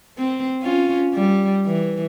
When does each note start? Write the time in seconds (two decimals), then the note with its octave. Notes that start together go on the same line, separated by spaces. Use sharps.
0.17 C4
0.62 C#4 F4
1.14 G3
1.66 E3